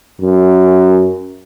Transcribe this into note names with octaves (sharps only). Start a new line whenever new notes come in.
F#2